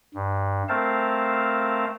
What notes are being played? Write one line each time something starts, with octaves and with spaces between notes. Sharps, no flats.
G2
A3 C4 A#4 C5 F5 A5